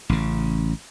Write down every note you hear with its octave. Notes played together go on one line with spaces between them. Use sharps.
A1 C#3